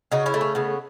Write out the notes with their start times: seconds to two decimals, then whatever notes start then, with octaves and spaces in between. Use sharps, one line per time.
0.12 C#3 D#4 F#4
0.26 C#4 E4
0.34 A3
0.41 C#4
0.55 C#3 B3